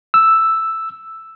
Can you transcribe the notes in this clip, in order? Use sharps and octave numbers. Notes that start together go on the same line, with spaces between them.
E6